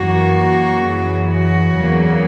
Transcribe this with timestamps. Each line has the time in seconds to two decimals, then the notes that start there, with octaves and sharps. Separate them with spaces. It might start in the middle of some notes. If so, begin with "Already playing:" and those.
Already playing: F#2 E3 A#3 F#4
0.83 F#2 C#3 E3
1.28 F#4
1.74 E2 C#3 F#3 A#3